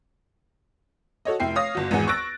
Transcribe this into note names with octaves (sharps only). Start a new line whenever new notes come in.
F#4 A4 C#5 D#5
F1 E4 G5 C7
C#5 F5 D#6 A#6
G1 F#4
G#1 E2 G#3 F#5 G#5
C#6 E6 F#6 A6 A#6 D7